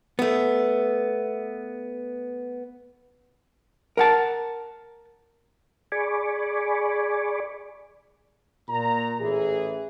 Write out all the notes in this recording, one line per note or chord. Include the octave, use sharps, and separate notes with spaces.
A3 B3
A#4 F#5 A5
G#4 D5 G#5 B5 C#6 D6
A#2 A#5
A1 E3 G#4